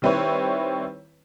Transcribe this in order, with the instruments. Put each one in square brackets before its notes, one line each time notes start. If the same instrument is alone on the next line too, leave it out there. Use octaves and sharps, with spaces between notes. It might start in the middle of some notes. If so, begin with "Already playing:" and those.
[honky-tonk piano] D#3 G3 C4 E4 B4 C#5